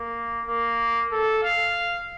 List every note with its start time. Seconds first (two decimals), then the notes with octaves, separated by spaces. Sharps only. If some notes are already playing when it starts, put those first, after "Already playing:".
Already playing: A#3
0.48 A#3
1.12 A4
1.43 F5